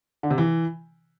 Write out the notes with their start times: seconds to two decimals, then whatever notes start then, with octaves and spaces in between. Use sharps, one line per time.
0.23 D3
0.31 C3
0.38 E3